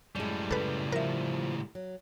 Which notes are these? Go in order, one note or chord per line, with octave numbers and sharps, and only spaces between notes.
F#2 A2 G3 G#3
C#3 A4 B4
F3 A#4 E5
F#3